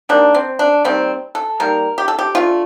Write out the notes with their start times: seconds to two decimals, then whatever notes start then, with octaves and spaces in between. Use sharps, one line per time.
0.09 D#3 G3 A#3 D4
0.35 C4
0.59 D4
0.85 D#3 G3 A#3 C4
1.35 A4
1.60 D#3 G3 A#3 A#4
1.98 G4
2.08 A4
2.19 G4
2.35 D3 A3 F4